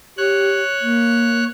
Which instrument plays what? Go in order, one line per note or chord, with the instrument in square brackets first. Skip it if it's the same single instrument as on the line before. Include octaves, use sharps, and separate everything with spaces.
[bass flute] G4 [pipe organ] C#5 F#6
[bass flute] A#3